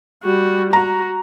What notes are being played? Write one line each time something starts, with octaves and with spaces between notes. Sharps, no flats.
G3 F#4
F#4 A#5